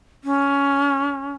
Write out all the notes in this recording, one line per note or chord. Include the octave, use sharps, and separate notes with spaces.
C#4